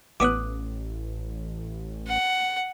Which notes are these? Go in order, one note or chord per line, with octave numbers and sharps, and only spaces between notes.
A1 E3 B3 C#5 D6 D#6 F#6
F#5